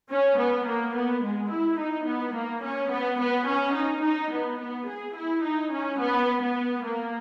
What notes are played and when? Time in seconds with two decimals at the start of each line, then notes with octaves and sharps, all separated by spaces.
0.11 C#4
0.39 B3
0.67 A#3
0.95 B3
1.23 G#3
1.51 E4
1.79 D#4
2.06 B3
2.34 A#3
2.63 C#4
2.91 B3
3.20 B3
3.48 C#4
3.76 D#4
4.03 D#4
4.32 B3
4.60 B3
4.88 G#4
5.16 E4
5.43 D#4
5.72 C#4
6.00 B3
6.42 B3
6.85 A#3